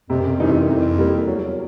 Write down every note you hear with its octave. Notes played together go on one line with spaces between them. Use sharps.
F2 C3
F#2
F2
F#2 E3 G3 C4 D#4
F2
F#2 E3
F2
G3 A#3
E2 F#3